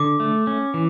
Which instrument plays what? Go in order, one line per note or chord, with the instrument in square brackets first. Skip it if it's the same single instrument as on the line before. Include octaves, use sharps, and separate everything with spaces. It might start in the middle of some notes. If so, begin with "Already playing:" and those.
Already playing: [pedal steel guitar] D3 [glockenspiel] D6
[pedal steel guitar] A3
C#4
E3